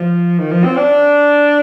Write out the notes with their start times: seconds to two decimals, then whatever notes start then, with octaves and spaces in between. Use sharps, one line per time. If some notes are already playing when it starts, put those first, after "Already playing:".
Already playing: F3
0.39 D#3
0.51 F3
0.64 C4
0.77 D4